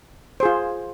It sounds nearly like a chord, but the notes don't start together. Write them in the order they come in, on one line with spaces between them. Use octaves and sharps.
C5 G#4 F4